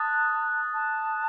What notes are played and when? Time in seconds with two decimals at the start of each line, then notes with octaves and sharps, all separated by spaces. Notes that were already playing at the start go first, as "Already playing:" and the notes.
Already playing: A5 D#6 F#6 A6
0.74 A5